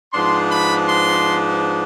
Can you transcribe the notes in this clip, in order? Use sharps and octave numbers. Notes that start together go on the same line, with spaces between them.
G#2 F3 B3 D4 C6
B5
C6